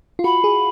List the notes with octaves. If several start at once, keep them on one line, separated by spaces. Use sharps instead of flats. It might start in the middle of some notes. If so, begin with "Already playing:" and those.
F4
F#4 B5
G#4